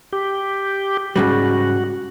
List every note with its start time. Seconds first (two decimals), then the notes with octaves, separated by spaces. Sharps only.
0.13 G4
1.16 G#2 C#3 G3 F#4